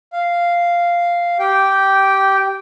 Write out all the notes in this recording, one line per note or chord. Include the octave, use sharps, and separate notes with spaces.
F5
G4 G5